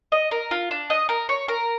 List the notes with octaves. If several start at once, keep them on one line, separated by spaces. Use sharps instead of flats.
D#5
A#4
F4
D4
D#5
A#4
C#5
A#4